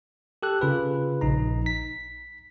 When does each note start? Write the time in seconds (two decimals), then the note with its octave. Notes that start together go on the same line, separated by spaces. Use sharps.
0.43 G4 A4 F#6
0.61 C#3 F4 B4
1.21 A#1 D#4 A#5
1.66 B6